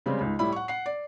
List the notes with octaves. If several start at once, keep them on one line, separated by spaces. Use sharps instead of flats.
C#3 G3 G#3 C4
C#2 G#2
A2 G3 E4 B5
F#5 C#6
F#5 C7
D5